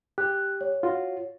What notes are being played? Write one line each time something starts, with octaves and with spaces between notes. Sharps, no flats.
G4 F#6
C#5
F4 F#4